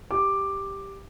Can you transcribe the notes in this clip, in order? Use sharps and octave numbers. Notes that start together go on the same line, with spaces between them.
G4 D6